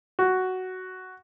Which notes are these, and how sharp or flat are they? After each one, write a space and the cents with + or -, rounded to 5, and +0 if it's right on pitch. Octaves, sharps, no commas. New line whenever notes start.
F#4 +5